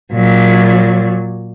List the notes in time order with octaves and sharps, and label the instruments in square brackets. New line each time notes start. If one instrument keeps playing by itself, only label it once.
[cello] A#2 F#3